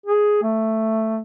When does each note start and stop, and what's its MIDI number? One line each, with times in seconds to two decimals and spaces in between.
0.06 0.40 68
0.43 1.21 57